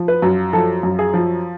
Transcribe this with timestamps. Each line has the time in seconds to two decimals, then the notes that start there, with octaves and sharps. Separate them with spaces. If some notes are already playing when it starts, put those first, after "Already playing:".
Already playing: F3
0.08 B4
0.22 F#2
0.53 F3 A4
0.83 F#2
0.99 G#4
1.14 F3